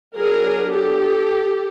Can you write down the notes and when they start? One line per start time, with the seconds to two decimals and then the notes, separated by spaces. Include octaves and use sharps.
0.17 F#3 B3 D4 G#4 A#4
0.71 G4 A4